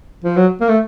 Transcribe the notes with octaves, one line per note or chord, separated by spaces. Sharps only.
F3
F#3
A#3
A3